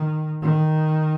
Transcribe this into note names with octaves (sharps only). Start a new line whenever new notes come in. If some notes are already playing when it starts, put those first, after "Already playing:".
Already playing: D#3
D#3